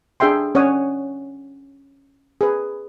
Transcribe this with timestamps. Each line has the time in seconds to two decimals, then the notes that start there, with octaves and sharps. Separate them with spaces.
0.20 D4 G#4 E5 G5 C6
0.55 C#4 C#5 D5 F#5 D#6
2.41 G#4 B4